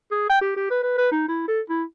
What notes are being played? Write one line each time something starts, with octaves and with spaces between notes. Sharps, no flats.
G#4
G5
G4
G4
B4
B4
B4
D#4
E4
A4
E4